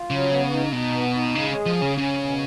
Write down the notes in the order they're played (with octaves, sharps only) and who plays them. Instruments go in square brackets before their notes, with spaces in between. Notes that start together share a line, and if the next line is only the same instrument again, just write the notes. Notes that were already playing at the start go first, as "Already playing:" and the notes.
Already playing: [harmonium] F4
[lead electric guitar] C#3 [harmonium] F#3
[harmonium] B3
D#4
[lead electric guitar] B2 [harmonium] D#4
[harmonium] B3
D#4
[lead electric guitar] C#3 [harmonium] G#3
[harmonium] G#4
[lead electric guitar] F3
[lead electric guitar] C#3 [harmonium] C#4
[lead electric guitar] C#3 [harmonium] C#4
[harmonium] B2